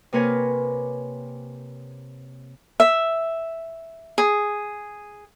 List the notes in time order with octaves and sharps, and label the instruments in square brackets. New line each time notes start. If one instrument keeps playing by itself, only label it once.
[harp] C3 A#3 A#4 B4 C#5 G#5
[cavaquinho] E5
G#4